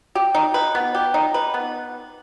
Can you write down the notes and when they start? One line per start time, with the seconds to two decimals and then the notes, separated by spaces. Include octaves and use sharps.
0.15 G4
0.35 D#4
0.54 B4
0.75 B3
0.95 G4
1.14 D#4
1.34 B4
1.54 B3